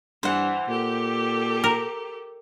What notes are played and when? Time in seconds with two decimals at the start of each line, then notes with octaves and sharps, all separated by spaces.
0.23 G2 E3 C5 F#5
0.69 A#2 G4 A4
1.64 A#4